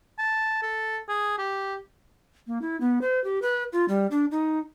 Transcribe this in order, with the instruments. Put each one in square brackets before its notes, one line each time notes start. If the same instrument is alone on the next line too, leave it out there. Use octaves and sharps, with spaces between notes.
[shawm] A5
A4
G#4
G4
[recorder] A#3
E4
B3
C5
G4
B4
F4
G3
D4
D#4